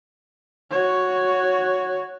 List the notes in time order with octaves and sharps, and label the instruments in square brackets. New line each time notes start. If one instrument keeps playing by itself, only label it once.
[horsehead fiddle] F#4 C#5